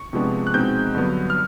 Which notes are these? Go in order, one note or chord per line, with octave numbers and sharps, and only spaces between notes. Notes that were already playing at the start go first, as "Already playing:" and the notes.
Already playing: C#6
C3 F3 G#3 B3 D4
F#6
B2 G#3 C4 D#4 G6
G2 D3 F#3 B3
F6